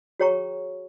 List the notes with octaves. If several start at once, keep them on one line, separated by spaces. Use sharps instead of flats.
F#4 G#4 C#5 G5 A#5 C#6